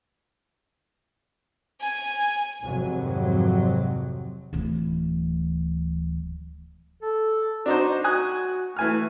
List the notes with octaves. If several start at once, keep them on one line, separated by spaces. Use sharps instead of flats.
G#5
G#1 F2 C3 F#3
D1 E3
A4
D4 D#4 F#4 C5
F#4 G#5 D#6 F#6
E3 A3 G#5 F6